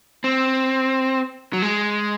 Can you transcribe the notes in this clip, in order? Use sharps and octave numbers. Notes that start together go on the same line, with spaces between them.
C4
F#3
G#3